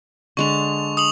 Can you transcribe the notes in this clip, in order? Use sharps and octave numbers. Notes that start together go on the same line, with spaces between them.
D3 G#3 D4 C#6 F7
D#6 F7 F#7